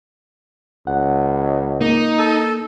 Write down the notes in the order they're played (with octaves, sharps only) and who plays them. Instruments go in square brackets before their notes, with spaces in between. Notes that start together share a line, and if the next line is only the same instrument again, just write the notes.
[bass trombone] C#2 [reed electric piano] F#5
[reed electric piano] A#3 [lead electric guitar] D#4
[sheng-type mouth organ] A4